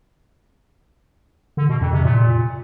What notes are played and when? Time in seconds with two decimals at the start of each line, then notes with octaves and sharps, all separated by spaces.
1.57 D3
1.69 B2
1.81 F2
1.93 C3
2.05 A#2